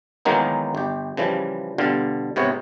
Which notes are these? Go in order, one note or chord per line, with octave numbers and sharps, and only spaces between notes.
D#3 E3 F#3 G#3 A#3 B3
G1 G4
C#3 E3 F3 G3
B2 D3 G3 F4
G#2 C3 B3 C#5